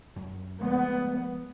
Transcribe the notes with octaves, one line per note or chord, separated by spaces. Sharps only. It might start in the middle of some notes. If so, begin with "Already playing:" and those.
F#2
F3 G#3 A3 B3